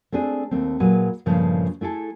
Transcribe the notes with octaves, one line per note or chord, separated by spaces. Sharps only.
A3 C4 D4 G#4
D#2 A3 C4
A#2 F#3 G#4 B4
G2 A#2 C#3 F3 A3
A3 E4 G#4 A4